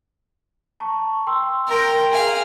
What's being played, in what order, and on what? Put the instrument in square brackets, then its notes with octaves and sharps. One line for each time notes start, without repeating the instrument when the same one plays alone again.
[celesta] A5 A#5 C#6
G5 C6 E6
[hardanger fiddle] A#4 G5 [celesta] A#5 C6 A#6
[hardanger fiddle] G#4 F5